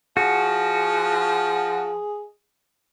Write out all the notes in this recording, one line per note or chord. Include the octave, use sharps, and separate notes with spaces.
F3 F#4 G#4